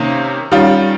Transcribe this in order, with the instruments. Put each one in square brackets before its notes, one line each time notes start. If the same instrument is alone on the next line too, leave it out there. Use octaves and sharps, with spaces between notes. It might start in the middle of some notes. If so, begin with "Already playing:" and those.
Already playing: [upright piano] C3 D#3 A#3 C#4
D#3 G3 C#4 F4